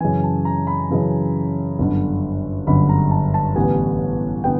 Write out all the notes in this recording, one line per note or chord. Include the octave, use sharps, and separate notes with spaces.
F#2 C#3 E3 G#5
A5
A#5
B5
F#2 C#3 E3
G1 F#2 D3
G1 F#2 D3 B5
A#5
A5
A5
A1 G2 D3 G3 B3 G#5
D3 B3 G5